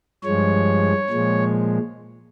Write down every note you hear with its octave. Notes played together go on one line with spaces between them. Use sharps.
G2 F3 G#3 C#5
A#2 F3 G#3